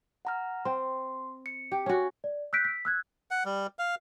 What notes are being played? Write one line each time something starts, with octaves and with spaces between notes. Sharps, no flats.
F#5 A#5 F6
C4 C6
C#7
G4
C#4 F#4 G#5
D5
E6 F#6 G6 B6 D7
B6
E6 F#6 G#6
F#5
G3
F5